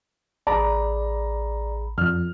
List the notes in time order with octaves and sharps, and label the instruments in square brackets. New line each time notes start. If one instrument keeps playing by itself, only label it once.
[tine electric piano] A1 G#4 B5 [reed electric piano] D5 [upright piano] A#5
[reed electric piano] F2 [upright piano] F6